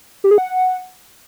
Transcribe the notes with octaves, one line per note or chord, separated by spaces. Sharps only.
G4
G#4
F#5